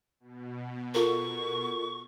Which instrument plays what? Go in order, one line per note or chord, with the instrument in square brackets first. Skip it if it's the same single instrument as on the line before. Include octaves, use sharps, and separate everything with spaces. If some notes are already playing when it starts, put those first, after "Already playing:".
[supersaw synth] B2
[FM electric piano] F4 A4 A#4 [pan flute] C#6